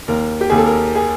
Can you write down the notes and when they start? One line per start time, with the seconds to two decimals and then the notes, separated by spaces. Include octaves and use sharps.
0.08 D#2 A#4
0.41 G4
0.50 D#2 G#4
0.58 A4
0.66 A#4
0.95 G#4